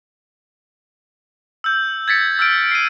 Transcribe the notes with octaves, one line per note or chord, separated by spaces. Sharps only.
E6 G6
G#6 A6 B6 C#7
E6 F6 G6 D7
C7 D#7